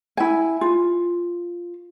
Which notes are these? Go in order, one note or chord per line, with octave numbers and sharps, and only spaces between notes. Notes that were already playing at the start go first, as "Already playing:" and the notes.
E4 G#5
F4